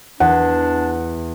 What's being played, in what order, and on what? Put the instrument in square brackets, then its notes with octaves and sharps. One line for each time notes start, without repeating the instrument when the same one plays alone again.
[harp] E2 [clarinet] D4 [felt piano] F#5